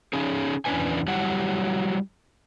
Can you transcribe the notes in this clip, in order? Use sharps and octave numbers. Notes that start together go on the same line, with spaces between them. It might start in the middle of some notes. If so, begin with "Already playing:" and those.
C#4 D#4 G#4
E2 E3 C#4 D4 B4 G#5
F#3 G3 E4 G4 F#5